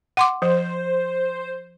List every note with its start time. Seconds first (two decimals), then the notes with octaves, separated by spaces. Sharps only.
0.17 F#5 C6 D6
0.42 F3 C5